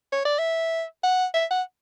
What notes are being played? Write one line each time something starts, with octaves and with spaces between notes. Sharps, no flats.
C#5
D5
E5
F#5
E5
F#5